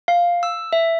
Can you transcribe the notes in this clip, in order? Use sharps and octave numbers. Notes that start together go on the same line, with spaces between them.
F5
E6
E5